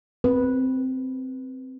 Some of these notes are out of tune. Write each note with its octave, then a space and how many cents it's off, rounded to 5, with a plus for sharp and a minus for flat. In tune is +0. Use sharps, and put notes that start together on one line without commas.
C4 -10 B4 -10